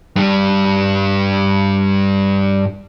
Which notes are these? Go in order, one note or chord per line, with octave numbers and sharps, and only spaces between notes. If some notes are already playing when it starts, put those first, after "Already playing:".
G2 G3